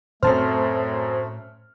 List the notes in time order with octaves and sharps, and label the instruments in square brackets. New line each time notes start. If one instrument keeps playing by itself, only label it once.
[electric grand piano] F#2 C4 F6 [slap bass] A2 C#4 [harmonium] A3 [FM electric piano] C5 A5